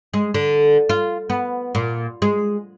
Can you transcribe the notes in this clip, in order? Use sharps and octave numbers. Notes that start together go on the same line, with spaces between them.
G#3
D3
F4
B3
A#2
G#3